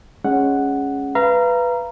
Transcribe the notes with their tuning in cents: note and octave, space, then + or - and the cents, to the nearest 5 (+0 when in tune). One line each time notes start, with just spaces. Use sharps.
G#3 +0 C#4 +0 F#5 +0
B4 +0 F5 -30 A#5 +0